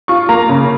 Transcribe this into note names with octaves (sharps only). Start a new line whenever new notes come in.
F4 C#6
A#3 A#5
C#3